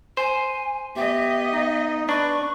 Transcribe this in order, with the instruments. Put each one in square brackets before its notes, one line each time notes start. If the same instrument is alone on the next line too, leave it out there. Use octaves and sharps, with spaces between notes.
[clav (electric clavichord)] C5 [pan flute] G#5
[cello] B3 D#5 [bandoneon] G4 [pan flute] E5
[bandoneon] D#4
[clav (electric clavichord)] D4 [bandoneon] B4 [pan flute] C#6